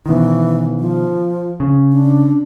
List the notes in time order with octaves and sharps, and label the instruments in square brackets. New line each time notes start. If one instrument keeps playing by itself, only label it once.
[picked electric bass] B2 D#3 [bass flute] E3
[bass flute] F3
[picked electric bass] C#3
[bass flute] D4